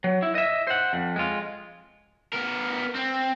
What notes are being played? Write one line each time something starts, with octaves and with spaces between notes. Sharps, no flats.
F#3
E4
D#5 E5
C5 F#5
F2
G#3 F4
B3 A#4
C4